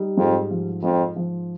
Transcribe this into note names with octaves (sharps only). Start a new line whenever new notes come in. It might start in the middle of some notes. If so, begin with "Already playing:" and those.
Already playing: G3 D#4
F2 G#2
F3
F2 G#2
F3